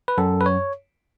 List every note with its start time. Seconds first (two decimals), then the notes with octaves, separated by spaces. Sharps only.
0.08 B4
0.18 F#2 A4
0.41 B4
0.46 C#5